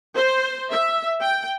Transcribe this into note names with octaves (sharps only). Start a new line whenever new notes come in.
C5
E5
G5